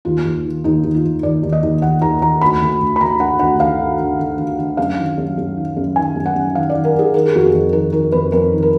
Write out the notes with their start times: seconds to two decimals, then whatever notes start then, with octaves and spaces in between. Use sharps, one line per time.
0.05 D#2 F4
0.25 D#2
0.45 D#3
0.64 D#2 D#4
0.84 D#2
0.95 F4
1.04 D#2
1.23 D#2 D5
1.43 D#2
1.52 D#5
1.63 D#2
1.82 D#2 F#5
2.02 D#2 A#5
2.22 D#2 A#5
2.41 D2 B5
2.62 D2
2.80 D2
2.96 B5
3.01 D2 A#5
3.20 D3 F#5
3.40 D2 F#5
3.60 D2 F5
3.79 D3
4.00 D3
4.19 D3
4.39 D3
4.59 D3
4.77 F#2 F5
4.98 D#3
5.18 F#2
5.38 F#2
5.57 D#3
5.77 F#2
5.96 D#3 G#5
6.16 F#2
6.26 F#5
6.35 F#2
6.55 D#3 F5
6.70 D5
6.75 D#3
6.85 A#4
6.95 D#3 G#4
7.14 D#3 A#4
7.26 G#4
7.34 F2 F#4
7.46 G#4
7.53 F2
7.73 D#3 A#4
7.92 D#3 A#4
8.12 F2 B4
8.32 F2 A#4
8.53 D#3
8.63 A#4